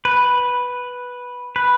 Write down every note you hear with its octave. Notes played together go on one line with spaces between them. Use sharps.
B4
B4